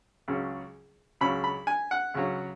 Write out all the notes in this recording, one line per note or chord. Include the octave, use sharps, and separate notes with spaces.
C#2 C#3 F#3 C#4
C#2 C#3 F#3 C#4 B5
B5
G#5
F#5
C#2 C#3 F#3 C#4